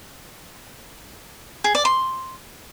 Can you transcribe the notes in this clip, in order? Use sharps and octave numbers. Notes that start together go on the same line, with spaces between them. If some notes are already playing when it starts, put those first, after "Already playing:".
G#4
D5
C6